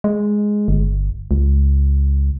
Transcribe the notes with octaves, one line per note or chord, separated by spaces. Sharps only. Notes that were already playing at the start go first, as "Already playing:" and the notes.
G#3
G1
C#2